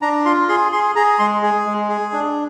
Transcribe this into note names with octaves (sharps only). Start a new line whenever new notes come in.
D4 A#5
F4 C6
G#4 C6
G#4 C6
G#4 A#5
G#3 C6
G#4
G#3
G#4
D4